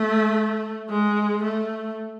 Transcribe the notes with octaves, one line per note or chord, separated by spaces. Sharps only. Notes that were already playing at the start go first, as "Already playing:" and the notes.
Already playing: A3
G#3
A3